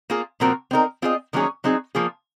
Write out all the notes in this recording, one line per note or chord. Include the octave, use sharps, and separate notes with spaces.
A#3 F4 G#4
A#2 F3 C4 F#4 A#4
C4 D#4 A#4
C4 F4 G#4 D#5
D#3 F#3 A#3 C#4 G#4
F#3 C4 D#4 G#4
F3 A#3 F4 G#4